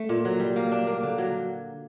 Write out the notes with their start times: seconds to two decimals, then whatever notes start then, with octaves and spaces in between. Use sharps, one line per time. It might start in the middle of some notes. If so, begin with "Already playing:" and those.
Already playing: A3
0.09 A#2
0.25 F#3
0.40 G3
0.56 A#3
0.72 D4
0.87 A#3
1.03 D3
1.18 F#3